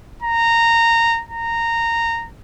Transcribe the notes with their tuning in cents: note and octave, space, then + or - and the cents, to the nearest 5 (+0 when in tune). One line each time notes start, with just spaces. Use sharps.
A#5 -15
A#5 -15